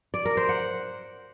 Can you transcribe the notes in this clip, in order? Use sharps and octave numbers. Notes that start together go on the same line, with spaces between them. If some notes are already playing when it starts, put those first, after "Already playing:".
D5
A#4
C5
F#5